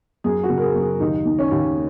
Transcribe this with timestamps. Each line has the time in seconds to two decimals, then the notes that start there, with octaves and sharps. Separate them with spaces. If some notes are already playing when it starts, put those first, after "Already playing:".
0.24 F#2 G#4
0.43 F#4
0.49 C#3
0.58 A#4
0.62 G#4
0.75 F#2
0.81 G#4
1.00 D#2 D#4
1.25 D#3
1.39 C#4
1.51 D#2